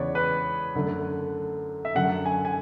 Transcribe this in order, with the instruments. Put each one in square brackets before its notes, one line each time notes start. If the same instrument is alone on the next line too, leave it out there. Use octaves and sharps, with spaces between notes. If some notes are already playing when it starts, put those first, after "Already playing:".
Already playing: [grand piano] E2 C#3 G#3 B3 B4 C#5 D5
B4
F#2 D3 A3
E5
F#2 D3 F#3 F#5
G#5
G#5